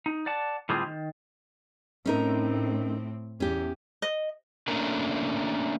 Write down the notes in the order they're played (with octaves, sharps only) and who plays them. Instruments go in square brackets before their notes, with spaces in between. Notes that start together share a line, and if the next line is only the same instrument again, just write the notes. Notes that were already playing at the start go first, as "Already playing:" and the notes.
[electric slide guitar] D#4
D5 F#5 A5
A2 D3 G3 C4 F4 G#4
D#3
[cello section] A2 C4 [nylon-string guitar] C#4 D#4 A#4
[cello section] E2 [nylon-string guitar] C#4 G4
[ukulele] D#5
[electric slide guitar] A3 A#3 C#4 D4 A#4